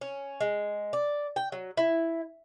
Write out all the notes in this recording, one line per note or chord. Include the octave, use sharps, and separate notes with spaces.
C#4
G#3
D5
G5
F#3
E4